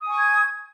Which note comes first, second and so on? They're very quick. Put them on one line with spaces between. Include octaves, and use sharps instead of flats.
D#6 G#5 C#6 G#6